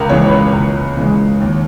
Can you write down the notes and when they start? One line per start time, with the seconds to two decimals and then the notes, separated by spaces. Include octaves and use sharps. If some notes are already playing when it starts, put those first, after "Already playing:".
Already playing: C#2 A#4
0.09 C#3 E3 G#3 C#5
0.26 B4
0.31 C#5
0.53 C#2
0.97 C#3 E3 G#3
1.40 D#2